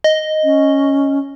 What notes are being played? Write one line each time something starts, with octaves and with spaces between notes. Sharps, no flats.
D#5
C#4